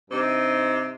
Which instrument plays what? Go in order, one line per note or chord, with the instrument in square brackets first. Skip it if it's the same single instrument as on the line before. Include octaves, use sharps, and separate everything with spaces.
[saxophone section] G2 C3 D#4 C5